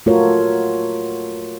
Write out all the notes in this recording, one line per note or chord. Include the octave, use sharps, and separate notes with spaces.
A3 F4 F#4 A4 A#4 C#5